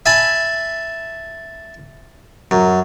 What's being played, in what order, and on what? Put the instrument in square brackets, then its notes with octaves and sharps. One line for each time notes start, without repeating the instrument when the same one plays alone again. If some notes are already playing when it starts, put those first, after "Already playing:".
[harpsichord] E5 G#5 A5 B5
F#2